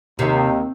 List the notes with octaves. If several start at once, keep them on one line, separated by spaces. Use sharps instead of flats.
D#2 C3 D#3